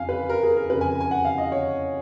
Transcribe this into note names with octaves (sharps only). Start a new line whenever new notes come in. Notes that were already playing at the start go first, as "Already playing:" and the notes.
Already playing: F2 C#3 F5 G#5
B4
A#4
G#4
A#4
F2 C#3 B4
G#5
G#5
F#5
F5
D#5
C#5